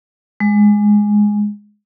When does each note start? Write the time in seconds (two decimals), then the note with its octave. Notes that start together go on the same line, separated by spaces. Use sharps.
0.40 G#3